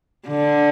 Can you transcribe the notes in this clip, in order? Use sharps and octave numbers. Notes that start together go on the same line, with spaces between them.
D3